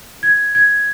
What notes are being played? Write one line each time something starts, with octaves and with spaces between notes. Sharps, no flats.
G#6
G#6